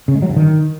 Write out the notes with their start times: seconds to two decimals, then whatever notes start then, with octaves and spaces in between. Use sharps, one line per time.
0.08 C#3
0.15 G#3
0.22 F#3
0.29 G2
0.37 D#3